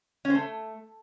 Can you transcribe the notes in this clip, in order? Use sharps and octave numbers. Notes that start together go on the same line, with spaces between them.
C#4
C5
A3